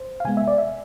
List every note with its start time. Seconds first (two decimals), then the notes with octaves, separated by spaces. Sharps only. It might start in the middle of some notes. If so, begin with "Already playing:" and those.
Already playing: C5
0.20 F5
0.25 C3 G#3 B3 G#5
0.37 E5
0.48 D5
0.58 E5